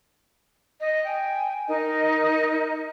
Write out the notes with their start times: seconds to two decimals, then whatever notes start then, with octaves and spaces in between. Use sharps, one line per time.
0.81 D#5
1.05 G5 G#5
1.67 D#4 A#4 D#5